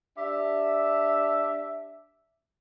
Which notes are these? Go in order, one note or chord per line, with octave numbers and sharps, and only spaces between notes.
D4 G4 E5